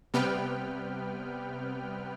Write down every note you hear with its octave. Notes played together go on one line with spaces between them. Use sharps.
C3 G3 B3 B4 G5 F6